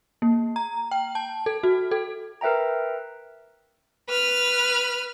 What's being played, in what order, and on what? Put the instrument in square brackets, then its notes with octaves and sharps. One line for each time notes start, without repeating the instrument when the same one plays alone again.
[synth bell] A#3
A#5
G5
A5
A4
F#4
A4
[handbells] A#4 B4 E5 G5 A#5
[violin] B4 F6